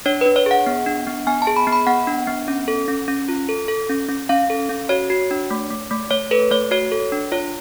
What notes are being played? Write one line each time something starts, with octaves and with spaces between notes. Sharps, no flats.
D4 C#5
D4 B4
C#5
G#4 F#5
B3
D4
B3
B3 G#5
A5
G#4
B5
B3
B5
B3 F#5
D4
B3
C#4
A4
C#4
C#4
F4
A4
A4
C#4
C#4
C#4 F5
A4
C#4
F#4 C#5
F#4
D4
A3
A3
A3
A3 C#5
A4 B4
A3 C#5
F#4 C#5
A4
D4
F4 C#5